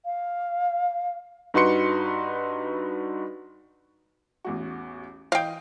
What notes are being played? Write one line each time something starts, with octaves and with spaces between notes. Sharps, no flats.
F5
G2 D#4 F#4 B4 C6 C#7
A1 E2 F#4
E3 D#5 F5 G5 D#6